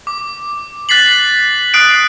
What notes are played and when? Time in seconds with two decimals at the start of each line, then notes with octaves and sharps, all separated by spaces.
0.07 D6
0.89 F#6 A6 B6 C7 F#7
1.74 D#6 F#6 C7 D7